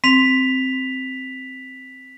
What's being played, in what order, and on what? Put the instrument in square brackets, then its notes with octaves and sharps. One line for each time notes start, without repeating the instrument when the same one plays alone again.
[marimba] C4 [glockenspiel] B6 F7